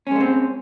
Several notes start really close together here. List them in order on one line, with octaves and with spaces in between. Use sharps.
C#4 G#3 A3 C4